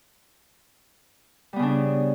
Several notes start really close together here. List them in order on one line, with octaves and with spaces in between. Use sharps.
G3 B3 C#3 D4